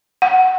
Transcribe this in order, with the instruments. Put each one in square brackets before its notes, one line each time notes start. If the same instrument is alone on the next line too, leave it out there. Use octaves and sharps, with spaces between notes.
[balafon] F#5